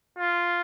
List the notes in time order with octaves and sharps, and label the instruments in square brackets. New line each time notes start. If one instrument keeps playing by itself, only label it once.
[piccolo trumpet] F4